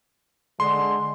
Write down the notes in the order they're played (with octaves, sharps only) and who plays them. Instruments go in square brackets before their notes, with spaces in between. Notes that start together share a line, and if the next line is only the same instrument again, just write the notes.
[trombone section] D3 G#3 [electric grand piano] C6